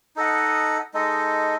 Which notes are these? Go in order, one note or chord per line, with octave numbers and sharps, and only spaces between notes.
D#4 A4 D#5 F#5
G#3 D#4 A4 D#5